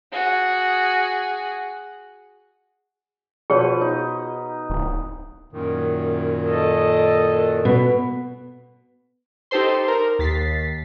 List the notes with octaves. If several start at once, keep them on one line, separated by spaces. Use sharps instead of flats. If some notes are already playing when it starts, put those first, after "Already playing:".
F#4 G#4
B2 F3 G#4 B4 C#5
D#4
D1
F#2 A#2 D#3
A4 D#5
B2
D#4 G4 A4 C5 C6
A#4
D#2 A6 B6 C7